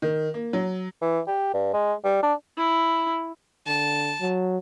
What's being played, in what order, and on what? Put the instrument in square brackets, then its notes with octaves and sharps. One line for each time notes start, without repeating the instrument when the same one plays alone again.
[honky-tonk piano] D#3
A#3
F#3
[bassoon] E3
G4
G2
G#3
G3
D4
[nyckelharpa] E4
[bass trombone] D3 [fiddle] A5
[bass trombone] F#3